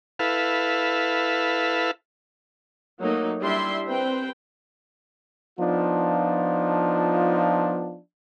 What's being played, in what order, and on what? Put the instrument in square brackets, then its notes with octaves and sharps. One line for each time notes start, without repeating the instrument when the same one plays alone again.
[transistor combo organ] E4 A4 B4 F5
[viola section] F#3 A3 A#3 D#4
G3 D4 E4 E5 C6
C4 B4 C5 G5
[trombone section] F3 B3 D4 D#4 F4